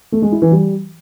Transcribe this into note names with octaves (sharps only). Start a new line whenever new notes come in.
A3
G#3
E4
E3
G3